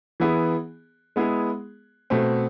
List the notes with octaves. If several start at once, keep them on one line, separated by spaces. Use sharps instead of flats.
E3 B3 E4 G#4
G#3 B3 E4 G#4
B2 A3 C4